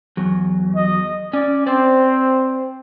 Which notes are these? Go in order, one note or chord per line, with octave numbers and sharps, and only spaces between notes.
E2 F#3
D#5
C#4 D5
C4 C5 D5